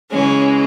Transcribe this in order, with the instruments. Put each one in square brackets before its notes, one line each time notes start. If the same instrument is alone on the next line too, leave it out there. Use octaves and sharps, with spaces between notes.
[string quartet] C#3 E3 G#3 C#4